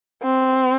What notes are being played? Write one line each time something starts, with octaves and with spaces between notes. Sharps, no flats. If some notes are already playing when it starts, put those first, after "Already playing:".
C4